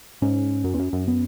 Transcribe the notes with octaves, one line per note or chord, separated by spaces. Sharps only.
G#2 C#4
F#2
E2
F#2
F#2
B3